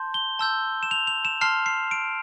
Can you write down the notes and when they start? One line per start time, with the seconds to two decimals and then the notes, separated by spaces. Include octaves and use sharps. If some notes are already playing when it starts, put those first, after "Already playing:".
Already playing: A5 C6 G6
0.14 G7
0.39 A5 E6 G6
0.83 E7
0.91 F7
1.07 F7
1.25 E7
1.41 A5 C6 F6 C7
1.66 C7
1.91 D7